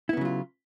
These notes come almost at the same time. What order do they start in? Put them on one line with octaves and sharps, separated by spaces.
E4 B3 C#3 F#3 F4